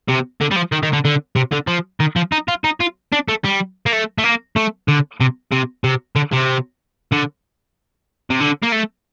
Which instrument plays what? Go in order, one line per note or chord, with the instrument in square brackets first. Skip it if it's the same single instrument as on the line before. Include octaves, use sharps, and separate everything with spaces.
[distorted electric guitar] C3
D3
G3
F3
D#3
D#3
D3
D3
C3
D3
F3
D#3
F3
D#4
F4
D#4
F4
D4
A3
G3
A#3
A3
A3
A#3
A3
D3
C3
C3
C3
D3
C3
D3
C3
D3
A#3
A3